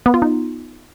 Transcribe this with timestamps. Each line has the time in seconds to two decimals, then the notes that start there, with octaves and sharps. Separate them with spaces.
0.06 B3
0.14 F4
0.22 D#4